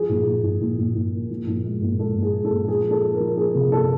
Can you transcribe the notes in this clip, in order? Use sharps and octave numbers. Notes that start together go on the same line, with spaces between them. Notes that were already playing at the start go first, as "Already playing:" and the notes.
Already playing: F3 G#4
A#2
A#2
A#2
A#2
A#2
A#2
A#3
F3
A#2
G#3
A#2
G#3 A4
A#2
G#4
G#3
A4
A#2
F3 G#4
A#3 A4
A#3
A#4
F3
A#3 G#4
C3
A#3 A4